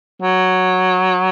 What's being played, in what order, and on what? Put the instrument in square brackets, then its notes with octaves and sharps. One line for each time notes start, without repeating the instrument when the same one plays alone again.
[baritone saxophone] F#3